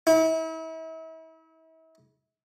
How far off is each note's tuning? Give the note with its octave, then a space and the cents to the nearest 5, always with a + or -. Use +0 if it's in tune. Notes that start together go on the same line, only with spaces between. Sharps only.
E4 -40